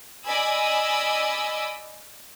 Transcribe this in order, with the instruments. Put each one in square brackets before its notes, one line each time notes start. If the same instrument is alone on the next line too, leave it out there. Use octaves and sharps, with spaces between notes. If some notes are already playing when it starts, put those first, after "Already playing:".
[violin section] D5 D#5 G#5 B5 E6